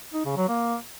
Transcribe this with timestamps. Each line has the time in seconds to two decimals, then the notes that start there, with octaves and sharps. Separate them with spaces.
0.13 D#4
0.25 C#3
0.37 F#3
0.49 A#3